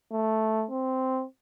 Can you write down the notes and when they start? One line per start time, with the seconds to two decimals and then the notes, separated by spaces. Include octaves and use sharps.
0.12 A3
0.71 C4